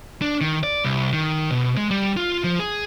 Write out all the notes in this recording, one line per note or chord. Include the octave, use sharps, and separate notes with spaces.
D4
D#3
D5
C2
D#3
B2
G#3
G3
F4
F3
G#4